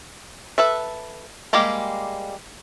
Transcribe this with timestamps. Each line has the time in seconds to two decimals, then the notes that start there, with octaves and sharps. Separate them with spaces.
0.58 A4 B4 E5
1.53 G3 G#3 A#3 G4